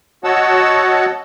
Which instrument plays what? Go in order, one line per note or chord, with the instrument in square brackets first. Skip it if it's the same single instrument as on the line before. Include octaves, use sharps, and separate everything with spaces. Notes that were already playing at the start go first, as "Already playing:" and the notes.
[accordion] F#4 C#5 D#5 F#5 A5 E6